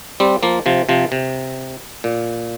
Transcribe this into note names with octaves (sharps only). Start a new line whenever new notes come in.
G3 C4
F3 A#3
C3 F3
C3 F3
C3
A#2